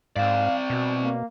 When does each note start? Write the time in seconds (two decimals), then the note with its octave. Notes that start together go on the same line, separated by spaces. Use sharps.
0.16 G#2 C4 D5 F5
0.70 B2 F#4
1.02 A#3